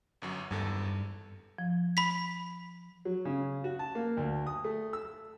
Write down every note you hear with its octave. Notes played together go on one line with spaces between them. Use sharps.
G1 F#2 F#3
G#1 E2 G2 A4
F3
B5 B6
F#3
C#3
F#4
A5
A#3
D2
D#6
A3
E6